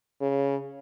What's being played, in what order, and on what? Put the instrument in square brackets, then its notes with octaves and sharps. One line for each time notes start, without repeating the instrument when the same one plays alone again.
[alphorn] C#3